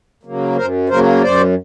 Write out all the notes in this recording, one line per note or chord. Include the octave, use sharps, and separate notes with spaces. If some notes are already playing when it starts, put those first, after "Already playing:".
C#3 F#3 A#3
F#2 A#4 C5
C#3 F#3 A#3 A#4 C5
F#2 C5 D5